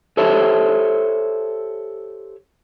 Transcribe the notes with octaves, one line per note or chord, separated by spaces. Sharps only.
G4 A4 C5 C#5 E5